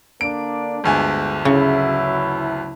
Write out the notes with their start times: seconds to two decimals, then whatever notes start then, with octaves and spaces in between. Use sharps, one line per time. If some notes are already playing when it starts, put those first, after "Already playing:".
0.21 D3 A#3 D4 D7
0.84 G1 D2 G#3 G#5
1.45 C#3 F#3 E4